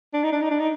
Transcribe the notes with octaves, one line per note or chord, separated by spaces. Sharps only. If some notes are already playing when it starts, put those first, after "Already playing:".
D4
D#4
D4
D#4
D4
D#4